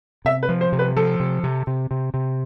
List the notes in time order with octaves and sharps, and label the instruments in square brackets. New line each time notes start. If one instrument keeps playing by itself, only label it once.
[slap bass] C3 [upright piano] E5
[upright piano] B4
[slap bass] F3
[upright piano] C5
[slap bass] C3
[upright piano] B4
[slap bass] F3 [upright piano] A4
[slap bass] C3
C3
C3
C3
C3